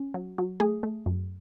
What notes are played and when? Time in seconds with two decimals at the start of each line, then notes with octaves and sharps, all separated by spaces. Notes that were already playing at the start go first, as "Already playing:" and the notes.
Already playing: C#4
0.14 F#3
0.38 F#3
0.60 A3 G#4
0.83 A3
1.06 F#2